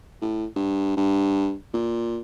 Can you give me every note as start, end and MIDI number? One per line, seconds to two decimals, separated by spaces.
0.22 0.46 45
0.56 0.96 43
0.97 1.54 43
1.73 2.21 46